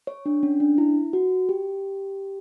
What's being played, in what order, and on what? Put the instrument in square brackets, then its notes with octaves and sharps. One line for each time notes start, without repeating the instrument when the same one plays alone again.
[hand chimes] C#5
D4
C#4
D4
E4
F#4
G4